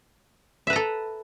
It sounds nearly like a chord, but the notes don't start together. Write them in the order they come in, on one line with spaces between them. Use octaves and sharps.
E5 B4 A#5 A4